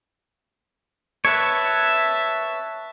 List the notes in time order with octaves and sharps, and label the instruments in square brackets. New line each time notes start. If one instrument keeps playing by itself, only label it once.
[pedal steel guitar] B4 C#5 [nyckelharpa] E5 A5